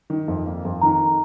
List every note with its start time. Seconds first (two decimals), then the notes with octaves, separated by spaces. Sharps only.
0.10 D#3
0.28 F2
0.46 A#3
0.65 F2
0.81 D#3 A#5